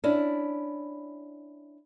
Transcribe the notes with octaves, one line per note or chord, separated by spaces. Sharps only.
C#4 D4 E4